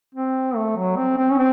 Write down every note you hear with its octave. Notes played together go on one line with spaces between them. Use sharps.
C4
A3
F#3
C4
C4
C#4
C4